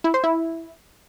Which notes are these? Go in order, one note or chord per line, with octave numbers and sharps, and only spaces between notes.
E4
C5
E4